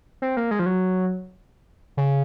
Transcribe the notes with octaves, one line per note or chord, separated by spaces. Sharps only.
C4
A#3
G#3
F3
F#3
C#3